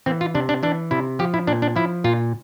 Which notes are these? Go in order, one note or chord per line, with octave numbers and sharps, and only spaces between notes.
E3 C4
F4
C3 D4
D4
E3 D4
C3 E4
F3 G4
E4
A#2 D4
D4
F3 E4
A#2 F4